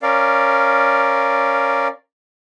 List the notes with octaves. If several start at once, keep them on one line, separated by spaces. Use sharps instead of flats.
C#4 A#4 D5 F5